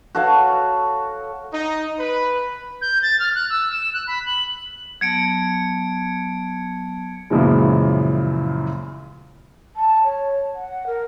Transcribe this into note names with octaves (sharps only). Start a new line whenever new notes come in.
F#4 A4 C#5 F5
D#4
B4
G6
A6
F6
F#6
E6
E7
F#6
B5
F#7
F#3 B3 A5 G#6 C#7 D7
F#2 A#2 C#3 E3 F3 G#3
A5
C#5
F#5
A#4